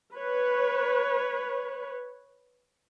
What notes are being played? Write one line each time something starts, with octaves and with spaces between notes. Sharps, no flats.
B4 C#5